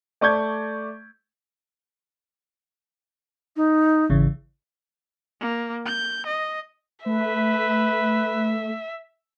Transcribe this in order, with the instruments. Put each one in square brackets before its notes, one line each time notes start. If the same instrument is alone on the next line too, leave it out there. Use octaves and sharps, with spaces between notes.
[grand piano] A3 D5 C#6 G6 G#6
[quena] D#4
[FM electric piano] G#1 C#3 E3
[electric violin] A#3
G6
D#5
[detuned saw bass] A3 [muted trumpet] B4 [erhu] E5